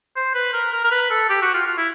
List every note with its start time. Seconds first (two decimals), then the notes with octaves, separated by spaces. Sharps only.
0.16 C5
0.35 B4
0.53 A#4
0.73 A#4
0.84 A#4
0.91 B4
1.10 A4
1.30 G4
1.42 F#4
1.54 F4
1.67 F4
1.77 E4